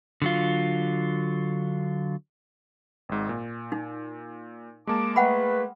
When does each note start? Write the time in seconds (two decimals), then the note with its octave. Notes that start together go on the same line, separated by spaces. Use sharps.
0.22 D3 F#3 F4
3.09 G#1 G#2
3.29 A#2
3.72 D#4
4.87 G#3 A#3 A5 D6
5.16 A3 B4 F#5 G5 B5